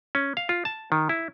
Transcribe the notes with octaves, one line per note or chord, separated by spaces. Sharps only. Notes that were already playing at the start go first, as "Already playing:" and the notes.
C#4
F5
F4
A5
D#3
E4